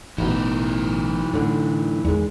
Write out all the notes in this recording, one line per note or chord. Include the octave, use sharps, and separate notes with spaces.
A1 B2 E3 D#4
A2 D3
E2 D#3 G#3